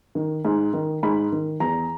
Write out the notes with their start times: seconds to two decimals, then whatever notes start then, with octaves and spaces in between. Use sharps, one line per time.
0.15 D#3
0.45 G#2
0.73 D#3
1.03 G#2 B5
1.32 D#3
1.60 E2 A#5